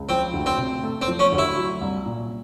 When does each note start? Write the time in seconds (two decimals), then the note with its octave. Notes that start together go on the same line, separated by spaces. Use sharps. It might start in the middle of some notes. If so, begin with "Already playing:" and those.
Already playing: C#2
0.09 F3 C4
0.33 D2
0.46 C4
0.58 C3
0.83 A3
1.02 C4
1.08 F3
1.19 C#4
1.32 D2
1.38 E4
1.57 F#3
1.81 C2
2.06 A#2